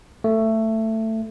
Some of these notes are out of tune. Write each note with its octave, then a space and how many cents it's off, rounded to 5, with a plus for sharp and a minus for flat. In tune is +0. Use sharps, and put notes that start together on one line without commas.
A3 +15